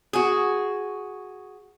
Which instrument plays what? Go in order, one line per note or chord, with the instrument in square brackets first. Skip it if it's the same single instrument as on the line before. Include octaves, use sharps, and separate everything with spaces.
[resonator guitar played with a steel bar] F#4 G#4